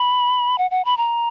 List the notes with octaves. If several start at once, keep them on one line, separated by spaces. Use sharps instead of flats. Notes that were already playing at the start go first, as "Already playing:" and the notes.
Already playing: B5
F#5
F#5
B5
A#5